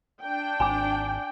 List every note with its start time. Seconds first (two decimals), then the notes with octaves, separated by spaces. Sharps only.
0.22 D4 G5
0.60 G#1 G#5 D6